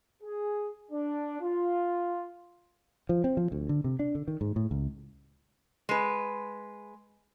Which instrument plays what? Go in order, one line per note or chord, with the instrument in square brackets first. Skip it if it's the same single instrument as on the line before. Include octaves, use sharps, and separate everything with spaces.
[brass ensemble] G#4
D4
F4
[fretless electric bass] F3
C4
F3
D2
D3
C3
D4
D3
D#3
G#2
A2
C#2
[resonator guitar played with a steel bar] G#3 B4